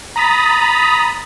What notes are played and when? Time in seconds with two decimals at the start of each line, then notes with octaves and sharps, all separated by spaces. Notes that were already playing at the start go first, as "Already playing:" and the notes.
0.16 A#5 B5 D#6 A6 B6